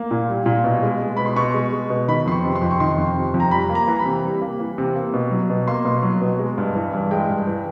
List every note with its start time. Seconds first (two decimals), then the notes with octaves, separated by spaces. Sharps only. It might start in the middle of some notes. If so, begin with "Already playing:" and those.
Already playing: A#3
0.11 A#2
0.28 G3
0.46 A#2
0.64 B2
0.83 G#3
1.00 G#3
1.17 B2 B5
1.26 C6
1.36 B2 C#6
1.54 G#3
1.72 G#3
1.90 B2
2.08 D#3 B5
2.26 F2 C6
2.32 C#6
2.44 C3
2.56 C6
2.62 F2
2.71 C#6
2.80 D#3 C6
2.98 F2
3.16 C3
3.34 F2
3.40 A#5
3.51 G3 B5
3.69 A#3
3.75 A#5
3.88 E3
3.99 B5
4.06 C3
4.23 G3
4.42 A#3
4.59 E3
4.78 C3
4.96 A#3
5.14 B2
5.31 F#3
5.50 B2
5.68 A#3 C6
5.85 B2
6.03 F#3
6.22 B2
6.39 G#3
6.58 G2
6.75 E3
6.93 G2
7.11 G#3 G5
7.29 G2
7.47 E3